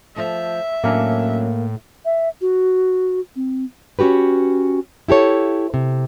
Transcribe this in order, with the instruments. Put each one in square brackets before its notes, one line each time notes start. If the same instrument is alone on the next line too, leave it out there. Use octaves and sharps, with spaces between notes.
[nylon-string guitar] F3 A3 [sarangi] E5
[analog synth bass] A2 [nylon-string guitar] F#3 C#4 D4 [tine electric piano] A#3 A#4
[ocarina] E5
F#4
C4
[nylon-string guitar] C#4 D#4 F#4 G4 B4
E4 G4 A4 C#5
C3